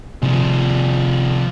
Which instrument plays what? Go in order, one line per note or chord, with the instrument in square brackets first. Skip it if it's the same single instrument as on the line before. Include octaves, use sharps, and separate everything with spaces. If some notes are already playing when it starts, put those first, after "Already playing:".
[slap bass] C3 D#3 A3 [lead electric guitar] F3 G#4